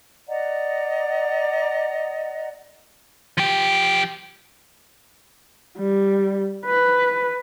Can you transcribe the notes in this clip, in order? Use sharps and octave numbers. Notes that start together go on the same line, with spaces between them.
D5 D#5 F#5 A#5
F3 G4
G3
B4